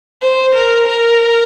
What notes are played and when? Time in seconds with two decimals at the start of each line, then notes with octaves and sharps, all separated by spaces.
0.22 C5
0.55 A#4
0.87 A#4